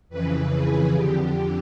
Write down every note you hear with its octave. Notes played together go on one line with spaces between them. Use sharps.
F2 C#3 E3 B4
G#4
F2 D3 G4